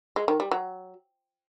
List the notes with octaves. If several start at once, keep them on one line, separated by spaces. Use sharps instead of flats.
G#3
D#3
G3
F#3